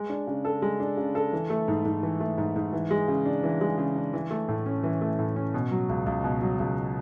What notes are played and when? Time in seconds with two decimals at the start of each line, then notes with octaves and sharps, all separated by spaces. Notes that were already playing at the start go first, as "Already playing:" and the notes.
Already playing: G#3
0.10 D4
0.27 C#3
0.45 A4
0.62 G#3
0.80 D4
0.97 C#3
1.15 A4
1.33 E3
1.50 A3
1.68 G#2
1.85 G#2
2.03 E3
2.20 A3
2.38 G#2
2.56 G#2
2.73 E3
2.91 G#3
3.08 C#3
3.25 D4
3.44 E3
3.61 G#3
3.78 C#3
3.96 D4
4.13 E3
4.31 A3
4.48 A2
4.66 C#4
4.83 E3
5.01 A3
5.19 A2
5.36 C#4
5.54 B2
5.71 F#3
5.89 C#2
6.06 C#2
6.24 B2
6.41 F#3
6.59 C#2